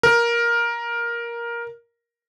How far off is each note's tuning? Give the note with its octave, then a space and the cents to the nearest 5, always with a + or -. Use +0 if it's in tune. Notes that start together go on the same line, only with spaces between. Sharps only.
A#4 +10